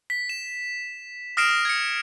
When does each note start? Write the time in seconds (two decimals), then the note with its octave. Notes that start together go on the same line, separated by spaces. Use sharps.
0.10 B6
0.29 E7
1.37 D#6 F6 A#6 C7 D7 E7
1.65 G#6 C#7